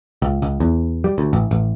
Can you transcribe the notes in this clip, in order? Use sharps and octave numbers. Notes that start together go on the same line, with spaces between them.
C#2
C#2
E2
G3
D2
A1
A1